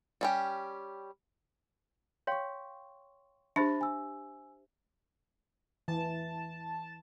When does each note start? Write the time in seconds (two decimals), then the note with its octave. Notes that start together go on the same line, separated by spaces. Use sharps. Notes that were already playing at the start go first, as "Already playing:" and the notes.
0.21 G3 C#4 G4
2.27 C#5 F5 G5 C6 C#6
3.56 D4 G4 C5 E5 A5 B5 A6
3.81 G#5 E6
5.88 E3 A5